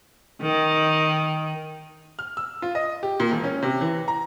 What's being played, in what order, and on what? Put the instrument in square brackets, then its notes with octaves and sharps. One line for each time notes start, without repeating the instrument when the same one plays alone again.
[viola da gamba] D#3
[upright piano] F6
E6
F4
D#5
G4
A#2
E1
C#4
C3
E3
A#5